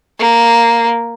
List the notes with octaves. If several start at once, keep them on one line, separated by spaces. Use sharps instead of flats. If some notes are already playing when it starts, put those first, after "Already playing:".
A#3